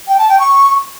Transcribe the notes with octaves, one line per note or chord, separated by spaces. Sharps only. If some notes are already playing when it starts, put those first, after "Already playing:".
G5
A5
G5
C#6